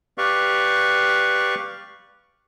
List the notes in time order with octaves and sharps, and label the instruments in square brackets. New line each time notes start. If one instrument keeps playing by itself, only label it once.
[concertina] G4 B4 D5 F5 C#6